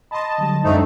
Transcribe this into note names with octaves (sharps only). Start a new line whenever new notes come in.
D#5 A5 B5 C6
D3 F#3 G3
C2 F#2 F#3 G#3 A3 C4 D4 D#4